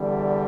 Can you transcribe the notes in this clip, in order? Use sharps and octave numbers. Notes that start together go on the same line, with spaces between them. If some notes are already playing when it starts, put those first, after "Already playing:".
Already playing: E2 D3 G3